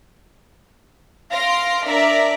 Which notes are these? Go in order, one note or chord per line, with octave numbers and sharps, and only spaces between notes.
F5 C6 A#6 C7 D7
D4 A#4 D5 E5 A#5